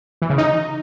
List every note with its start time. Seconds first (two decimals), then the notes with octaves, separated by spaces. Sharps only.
0.22 E3
0.30 C#3
0.38 D#4